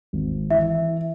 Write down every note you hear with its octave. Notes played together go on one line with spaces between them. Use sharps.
G#1
E3 E5